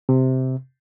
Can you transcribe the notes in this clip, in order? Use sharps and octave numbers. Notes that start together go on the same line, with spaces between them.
C3